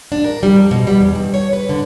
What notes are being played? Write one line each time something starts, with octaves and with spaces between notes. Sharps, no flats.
D4
A#4
G3
F2
B2
G3
E2
G2
C#5
B4
D3